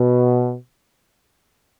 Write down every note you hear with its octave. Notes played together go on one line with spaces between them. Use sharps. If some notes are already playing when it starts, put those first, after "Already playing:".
Already playing: B2